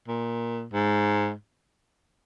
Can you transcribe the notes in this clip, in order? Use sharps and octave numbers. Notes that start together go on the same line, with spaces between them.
A#2
G#2